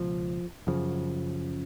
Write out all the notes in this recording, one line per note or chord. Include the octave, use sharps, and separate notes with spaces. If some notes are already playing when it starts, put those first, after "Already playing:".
Already playing: C#2 B2 F3
F#2 C#3 F3